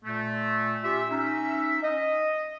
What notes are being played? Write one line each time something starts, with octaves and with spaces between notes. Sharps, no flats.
A#2 A3
C#4 F4 G4 E5
C#4 D#4 E5
D#5